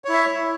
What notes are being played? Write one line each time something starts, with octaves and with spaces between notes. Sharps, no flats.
E4 C#5 E5